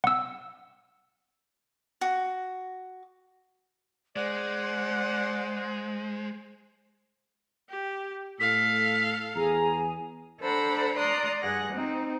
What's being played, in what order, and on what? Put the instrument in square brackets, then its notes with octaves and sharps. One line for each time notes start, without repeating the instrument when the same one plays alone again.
[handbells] F#5 E6
[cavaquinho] F#4
[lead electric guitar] G#3 [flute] C5 [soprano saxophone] D5 [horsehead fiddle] F#5
[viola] G4
[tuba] A2 [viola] A4 F5 [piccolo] B6
[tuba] E2 [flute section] G#4 G#5 [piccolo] A#5
[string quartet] D4 A4 C5 F#5 A#5 B5
D5 A#5 C6 D#6 F#6
G2 G#4 F#5 F#6 A#6
C4 D#4